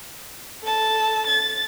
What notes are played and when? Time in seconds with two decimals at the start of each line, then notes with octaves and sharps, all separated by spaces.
0.63 A4 A5
1.27 A6